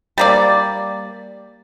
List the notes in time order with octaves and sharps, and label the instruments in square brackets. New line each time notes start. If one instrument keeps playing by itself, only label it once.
[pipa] G3 A#3 D5